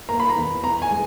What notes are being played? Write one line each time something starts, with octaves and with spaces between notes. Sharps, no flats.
A#3 A#5
B5
A#5
E2
B3 A#5
G#5
G#3